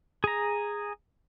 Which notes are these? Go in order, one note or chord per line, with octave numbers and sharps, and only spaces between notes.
G#4 A#5